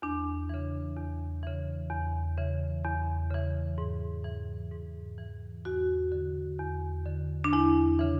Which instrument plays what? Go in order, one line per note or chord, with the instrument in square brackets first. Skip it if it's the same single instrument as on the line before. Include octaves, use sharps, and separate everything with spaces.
[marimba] E2 D4
C#3 E3
E2
C#3 E3
E2
C#3 E3
E2
C#3 E3
G#2
E3
G#2
E3
E2 F#4
D3
E2
D3
D4
E2 E4
C#3 E3